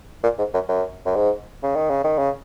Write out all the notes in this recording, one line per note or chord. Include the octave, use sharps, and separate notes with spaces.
A#2
G#2
F#2
F#2
F#2
G#2
C#3
D#3
C#3
D#3
C#3